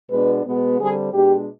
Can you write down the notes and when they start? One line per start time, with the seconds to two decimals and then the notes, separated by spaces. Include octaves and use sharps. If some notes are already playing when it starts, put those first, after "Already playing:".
0.10 B2 G#3 B3 D4 B4
0.45 B2 G#3 B3
0.79 D3 G3 C4 G#4
1.13 B2 G#3 D4 G4